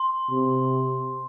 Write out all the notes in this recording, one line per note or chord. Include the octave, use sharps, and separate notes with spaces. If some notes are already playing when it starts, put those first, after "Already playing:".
Already playing: C6
C3